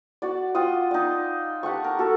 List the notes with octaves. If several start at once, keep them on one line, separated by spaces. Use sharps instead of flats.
F#4 D5
F4 F#5 G5 D#6
D#4 D5
G4 F#5 A5 C#6
A#4
F#4 A4